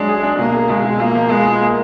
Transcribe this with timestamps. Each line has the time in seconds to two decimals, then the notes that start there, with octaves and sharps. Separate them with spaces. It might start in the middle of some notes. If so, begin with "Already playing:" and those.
Already playing: F#3 G#3 D4
0.09 G#4
0.23 D4
0.39 B2 A#3
0.54 G#4
0.70 B2 G#3
0.85 B2
1.00 A#3 F4
1.15 F3
1.30 G#3 B3
1.46 F4
1.61 A#3